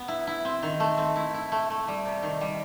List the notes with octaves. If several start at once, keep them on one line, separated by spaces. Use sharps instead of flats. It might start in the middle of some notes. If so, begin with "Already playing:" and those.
Already playing: B3
E4
E4
C4
D#3
A3
C4
E4
E4
A3
A3
G3
C3
D#3
G3